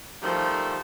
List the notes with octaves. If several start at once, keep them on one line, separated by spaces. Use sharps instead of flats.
D#3 F3 G3 A3